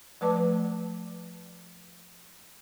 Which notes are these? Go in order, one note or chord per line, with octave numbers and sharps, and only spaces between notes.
F3 A3 B4 D5 A5 D6